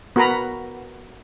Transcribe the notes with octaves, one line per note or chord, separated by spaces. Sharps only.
B3 F#4 A#4 B4 A#5 B5